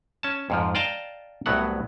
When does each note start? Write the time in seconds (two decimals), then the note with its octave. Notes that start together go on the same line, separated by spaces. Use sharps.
0.23 C#4 A5
0.50 F2 G#2 F3
0.75 D5 D#5 F5 G5 A5 A#5
1.46 C2 A2 F#3 B3 F#5